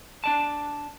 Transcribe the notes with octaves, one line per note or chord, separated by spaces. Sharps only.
D4 D5 A5